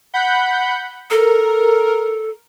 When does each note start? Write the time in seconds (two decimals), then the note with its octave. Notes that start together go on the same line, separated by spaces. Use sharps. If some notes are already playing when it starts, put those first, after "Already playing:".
0.14 F#5 B5 G6
1.11 A4 A#4